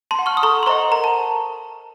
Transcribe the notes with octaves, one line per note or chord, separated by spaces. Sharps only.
A5 C6
F#5
C#6 F6
D#6
A4 A#5 C#6
C6
C5 D#5 F#5 A#5 C#6
A#4 A#5
A5